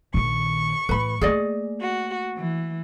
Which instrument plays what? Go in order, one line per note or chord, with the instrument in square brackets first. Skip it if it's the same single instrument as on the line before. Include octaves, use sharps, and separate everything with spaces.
[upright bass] A#1 D#3 [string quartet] C#6
[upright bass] A2 E3 [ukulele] B4 B5
[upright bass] A3 A#3 [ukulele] G#4 D5 D#5
[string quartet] F#4
E3